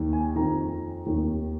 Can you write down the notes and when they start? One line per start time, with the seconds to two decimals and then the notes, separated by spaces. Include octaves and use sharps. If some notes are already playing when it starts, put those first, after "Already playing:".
Already playing: D#2 D#3
0.13 G#5
0.36 F2 D#3 A#5
1.06 D#2 D#3